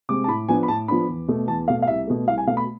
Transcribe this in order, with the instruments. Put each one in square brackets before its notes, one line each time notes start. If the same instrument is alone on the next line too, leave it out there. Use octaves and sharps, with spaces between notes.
[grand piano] C3 G#3 C4 D6
A5
A2 B5
F3 B3 D4 G#5
B5
A2 A5
F3 B3 D4 B5
E2
B2 A3
E2 A5
B2 A3 F5
F5
C2 E5
B2 A3
C2 F5
G#5
B2 A3 F5
B5